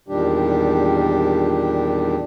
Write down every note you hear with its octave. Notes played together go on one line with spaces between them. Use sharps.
E2 A#2 D#3 G3 D4 G4